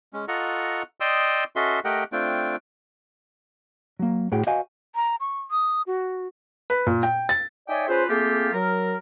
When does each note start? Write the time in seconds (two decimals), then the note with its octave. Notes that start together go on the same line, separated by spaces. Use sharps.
0.13 G#3 C#4
0.28 F4 A4 D#5 F#5 A#5 C#6
1.00 D5 D#5 G5 C6 D#6 E6
1.56 C#4 F#4 A4 D#5 E5 C6
1.85 A3 G4 A#4 D#5 F#5 G5
2.12 A3 C4 D4 F4 G5
3.99 F#3 A#3
4.32 A2 F#4 G#4 F#5 G5
4.47 F#4 C5 D#5 F5 F#5 G#5
4.95 A#5
5.20 C#6
5.51 D#6
5.87 F#4
6.70 B4
6.87 A#2
7.03 G5
7.29 A6
7.68 D#4 C#5 D5 E5 G5 G#5
7.88 C#4 F4 G#4 B4 C5
8.09 A3 A#3 C4 F4 G4 G#4
8.53 F#3 A#4